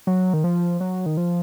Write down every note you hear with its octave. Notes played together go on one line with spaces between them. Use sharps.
F#3
D#3
F3
F#3
D#3
F3